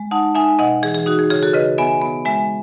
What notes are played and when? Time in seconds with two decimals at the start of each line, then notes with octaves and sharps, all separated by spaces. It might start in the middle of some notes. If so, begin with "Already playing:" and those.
Already playing: G#3
0.11 D#4 F#5 A5
0.35 D#4 E5 G#5
0.59 B2 D#5 F#5
0.83 E3 G#4
0.95 G#4
1.06 D#4 F#4
1.19 G#4
1.30 C#3 G#4
1.42 F#4 A4
1.54 C#3 B4 D#5
1.78 B3 E5 G#5
2.01 B3
2.25 G#3 E5 G#5